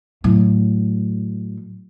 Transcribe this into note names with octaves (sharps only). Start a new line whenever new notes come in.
A2 F#3